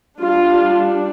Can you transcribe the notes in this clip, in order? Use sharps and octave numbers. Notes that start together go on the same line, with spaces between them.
G3 D4 F4